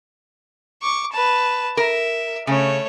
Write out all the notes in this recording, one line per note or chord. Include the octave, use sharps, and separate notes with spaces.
C#6 D6
B4 A5
A#4 E5
C#3 A3 C#5